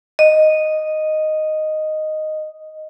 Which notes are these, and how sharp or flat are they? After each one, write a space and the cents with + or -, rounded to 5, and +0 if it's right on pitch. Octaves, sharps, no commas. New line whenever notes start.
D#5 -5